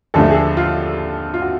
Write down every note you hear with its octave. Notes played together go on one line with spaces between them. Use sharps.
D#2 D3 F3 A3 A4
G#4
A4
F4
F4
F#4